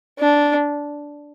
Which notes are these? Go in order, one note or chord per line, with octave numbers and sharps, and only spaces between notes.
D4